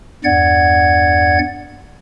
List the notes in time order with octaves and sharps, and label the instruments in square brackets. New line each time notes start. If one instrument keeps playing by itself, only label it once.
[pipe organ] E2 G2 D5 F#5 G#6